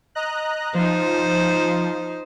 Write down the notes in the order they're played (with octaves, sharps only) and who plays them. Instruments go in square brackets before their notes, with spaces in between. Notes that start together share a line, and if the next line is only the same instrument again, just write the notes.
[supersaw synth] D#5 A#5 F#6
[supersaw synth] F3 [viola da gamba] D#4 C5